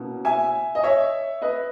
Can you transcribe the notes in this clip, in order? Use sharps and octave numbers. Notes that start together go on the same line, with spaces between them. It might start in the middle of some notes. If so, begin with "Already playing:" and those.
Already playing: B2 A#3 C#4 E4
E5 G#5
D#5
C#5 E5
B4 D#5